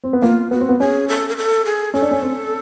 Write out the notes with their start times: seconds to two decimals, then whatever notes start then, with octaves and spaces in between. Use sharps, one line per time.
0.04 C4
0.13 B3
0.22 A#3 F4
0.51 B3 F#4
0.60 C4
0.69 B3
0.80 C#4 G#4
1.08 A4
1.29 A#4
1.37 A4
1.65 G#4
1.94 C#4 A4
2.02 D4
2.11 C#4
2.21 C4